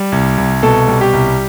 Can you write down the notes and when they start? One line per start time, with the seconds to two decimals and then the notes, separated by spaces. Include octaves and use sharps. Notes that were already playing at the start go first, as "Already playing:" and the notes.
Already playing: G3
0.12 C2
0.38 C2
0.63 B2 A4
0.88 G3
1.01 G4
1.13 C2